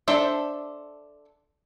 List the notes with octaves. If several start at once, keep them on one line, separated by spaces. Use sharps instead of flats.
D4 A4 C5 E5